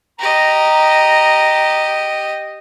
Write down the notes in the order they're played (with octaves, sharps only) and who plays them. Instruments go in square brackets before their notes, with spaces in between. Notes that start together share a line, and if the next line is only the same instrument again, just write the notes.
[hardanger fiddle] G4 D#5 [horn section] A#5